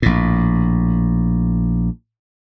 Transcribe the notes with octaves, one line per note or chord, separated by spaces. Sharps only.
A#1 A2